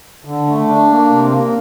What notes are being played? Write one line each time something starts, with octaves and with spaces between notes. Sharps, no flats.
D3
A3
D4
A#3
C3
A#3